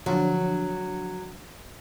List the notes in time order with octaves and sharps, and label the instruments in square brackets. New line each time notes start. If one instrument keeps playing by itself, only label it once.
[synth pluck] D3 F3 D4 [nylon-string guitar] F#3